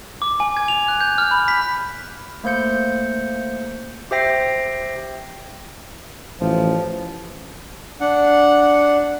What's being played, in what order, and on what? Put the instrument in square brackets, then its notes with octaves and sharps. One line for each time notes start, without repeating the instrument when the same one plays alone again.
[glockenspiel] D6
G#5
G#6
F7
F#6
G6
F6
B5
B6
[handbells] A3 A#3 C5 G6 C#7
G4 C5 E5 G5 A#6 C7
[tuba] A1 [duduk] F3
[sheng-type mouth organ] D4 F#5